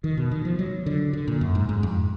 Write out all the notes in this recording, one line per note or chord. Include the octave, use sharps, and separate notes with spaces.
D#3
B2
D#3
F3
F#3
D3
D3
A#2
F#2
G#2
G#2
F2